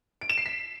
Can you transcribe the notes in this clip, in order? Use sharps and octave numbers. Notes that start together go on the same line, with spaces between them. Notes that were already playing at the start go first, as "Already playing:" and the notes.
D7
E7
C7
B6